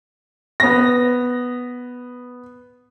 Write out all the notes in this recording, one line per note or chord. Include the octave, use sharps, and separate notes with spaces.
B3 A#6